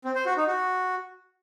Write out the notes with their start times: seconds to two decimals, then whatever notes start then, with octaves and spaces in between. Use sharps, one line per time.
0.05 C4
0.15 C5
0.26 F#4
0.37 D#4
0.48 F#4